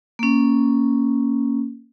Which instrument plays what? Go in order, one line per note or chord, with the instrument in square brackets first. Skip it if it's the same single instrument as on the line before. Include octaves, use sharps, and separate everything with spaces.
[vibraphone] A#3 C#4